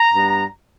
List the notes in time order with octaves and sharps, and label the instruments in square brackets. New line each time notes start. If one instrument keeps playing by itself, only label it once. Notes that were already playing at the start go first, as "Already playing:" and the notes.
Already playing: [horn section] A#5
G2 G3 B3